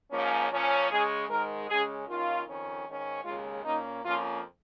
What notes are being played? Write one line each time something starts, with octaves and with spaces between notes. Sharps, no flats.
G#2 F3 A#3 C#4
A#2 F3 C#4
C#3 G#3 C#4 G#4
G#2 D#3 G#3 A#4
C#3 G#3 C#4 G#4
D#2 D#3 C#4 F4
F2 D#3 C#4
G#2 D#3 C#4
D#2 C#3 G#3 C#4 F4
A#2 A#3 C#4 D#4
F2 F3 A#3 C#4 F4